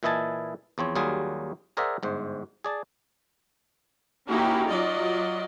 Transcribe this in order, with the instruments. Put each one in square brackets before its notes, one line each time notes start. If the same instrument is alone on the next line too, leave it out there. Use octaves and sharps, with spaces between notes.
[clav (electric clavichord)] A#2 E3 E4 D#5 G#5 A5
E2 F3 C4 C#5
D#2 F#3 G3 F4 G#4
G#4 A#4 C5 D5 E5 F#5
G1 G#2 C5
G#4 D5 A5
[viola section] A#3 C#4 D#4 E4 F#4 G4
F#3 F4 D5 D#5